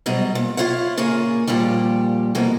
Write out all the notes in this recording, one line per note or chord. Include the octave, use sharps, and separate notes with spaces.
G#2 B2 F#3 G3
A#2
E4 F4 C#5 F5 F#5
A#2 C#3 A#3 G#4 C#5
D#2 A#2 F3 G3 G4
F2 B2 E3 A#3